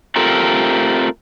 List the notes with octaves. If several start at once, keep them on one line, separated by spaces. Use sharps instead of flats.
A3 C4 F4 G4 A4 A#4